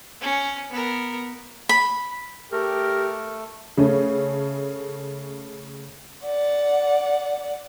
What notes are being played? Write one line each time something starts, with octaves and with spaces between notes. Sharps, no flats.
C#4
B3 A#4
B5
A3 G4 A#4
C#3 A3 C#4
D5 F#5